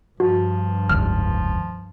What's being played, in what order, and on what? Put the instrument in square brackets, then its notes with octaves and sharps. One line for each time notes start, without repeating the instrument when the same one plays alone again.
[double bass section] G2 [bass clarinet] F3 [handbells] F#4
[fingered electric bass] F1 C#2 D#3 [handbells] F6